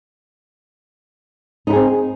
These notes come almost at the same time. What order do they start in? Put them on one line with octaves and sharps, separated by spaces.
D#4 E4 G#4 C4